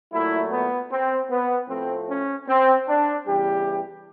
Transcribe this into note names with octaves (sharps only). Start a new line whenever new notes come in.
A#2 F#3 A3 E4
B3
C4
B3
A2 F3 A3 C4
C#4
C4
D4
E2 C#3 E3 G3 G4